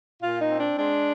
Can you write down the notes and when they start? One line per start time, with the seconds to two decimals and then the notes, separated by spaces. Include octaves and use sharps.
0.20 A#2 F4
0.38 D#4
0.48 C4
0.58 D4
0.77 G#3 D4